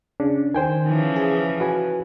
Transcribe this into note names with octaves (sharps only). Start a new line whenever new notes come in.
C#3 D4
D#3 C5 G5 G#5
C#3 E3 F3
G#4
F#4 B4 G#5